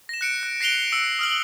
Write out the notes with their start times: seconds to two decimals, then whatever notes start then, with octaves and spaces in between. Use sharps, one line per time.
0.09 A#6 E7
0.21 F#6 C#7 D7
0.43 F#6
0.61 A#6 C7 D7 F7 G7
0.92 E6 C#7
1.19 D#6 F6 F#7